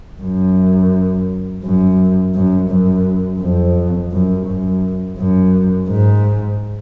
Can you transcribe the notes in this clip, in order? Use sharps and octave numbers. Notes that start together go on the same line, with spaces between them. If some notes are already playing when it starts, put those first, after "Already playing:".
F#2
F#2
F#2
F#2
F2
F#2
F#2
F#2
G#2